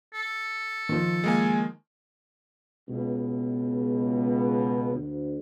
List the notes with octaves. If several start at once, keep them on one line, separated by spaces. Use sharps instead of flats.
A4
D#3 F3
G#3 A#3 G#5
C#2 B2
D2